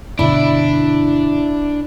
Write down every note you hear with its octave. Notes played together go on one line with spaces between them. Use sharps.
G1 B2 D3 D4 E4